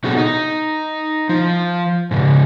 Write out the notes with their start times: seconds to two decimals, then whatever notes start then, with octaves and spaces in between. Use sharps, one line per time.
0.04 B2 F#3 B3 F#4 G#4 A4
0.17 D#4
1.29 F3
2.11 G#2 C#3